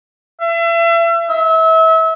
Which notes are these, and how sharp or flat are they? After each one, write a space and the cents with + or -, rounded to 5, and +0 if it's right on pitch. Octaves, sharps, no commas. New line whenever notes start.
E5 +35
E5 -30